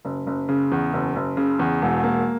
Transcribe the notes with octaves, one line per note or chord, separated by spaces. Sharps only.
F#1
F#1
C#3
E2
F#1
F#1
C#3
E2
E1
A#3